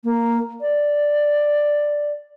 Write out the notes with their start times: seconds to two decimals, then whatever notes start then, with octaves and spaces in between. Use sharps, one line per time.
0.04 A#3
0.61 D5